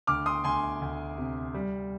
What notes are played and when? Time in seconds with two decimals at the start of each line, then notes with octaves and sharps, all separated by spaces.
0.07 D2 D6 F6
0.26 C6 D#6
0.44 D2 G#5 C6
0.81 D2
1.18 C3
1.54 G3